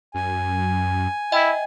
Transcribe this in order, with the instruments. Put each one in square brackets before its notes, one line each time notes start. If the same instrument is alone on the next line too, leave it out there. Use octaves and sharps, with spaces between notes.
[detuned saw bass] F#2 [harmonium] G#5
[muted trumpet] E4 [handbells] D#5 E5 G5